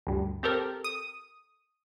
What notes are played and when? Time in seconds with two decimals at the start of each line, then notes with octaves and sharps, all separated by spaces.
0.07 D2 G2
0.43 C4 G4 A4 A#4
0.84 D#6